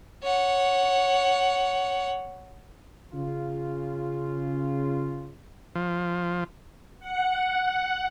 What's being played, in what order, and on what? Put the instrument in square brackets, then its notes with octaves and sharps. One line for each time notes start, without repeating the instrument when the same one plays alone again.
[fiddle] C#5 F#5
[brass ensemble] C#3 F4
[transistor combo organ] F3
[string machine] F#5